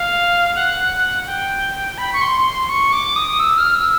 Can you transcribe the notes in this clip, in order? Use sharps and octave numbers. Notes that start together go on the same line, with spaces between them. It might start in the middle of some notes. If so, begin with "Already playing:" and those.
Already playing: F5
F#5
G5
B5
C#6
C6
C6
C#6
D6
D#6
E6
F6
E6